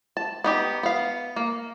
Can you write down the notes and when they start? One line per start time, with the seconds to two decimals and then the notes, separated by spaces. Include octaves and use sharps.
0.17 A5
0.44 B3 D#4 G4
0.83 B3 F5
1.36 A#3